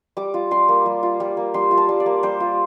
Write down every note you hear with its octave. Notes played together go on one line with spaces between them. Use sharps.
G3 D6
F4
G3 C6
A#3
G3
F4
G3
A#3
G3 C6
F4
A5
G3
D5
A#3
G3 C5
F4